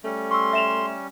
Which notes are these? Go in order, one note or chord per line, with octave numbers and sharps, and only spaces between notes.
G3 A3 C#4
C6 C#6 E6
E5 E7 F7